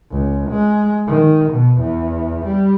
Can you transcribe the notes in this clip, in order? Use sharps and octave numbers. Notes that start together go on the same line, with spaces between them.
C#2
G#3
D#3
B2
E2
G3